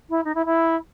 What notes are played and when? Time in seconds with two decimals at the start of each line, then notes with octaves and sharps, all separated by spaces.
0.09 E4
0.24 D#4
0.34 E4
0.45 E4